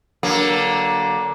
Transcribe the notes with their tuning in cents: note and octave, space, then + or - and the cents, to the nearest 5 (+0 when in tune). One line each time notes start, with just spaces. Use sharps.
D3 +0 F#3 +25 A#3 +20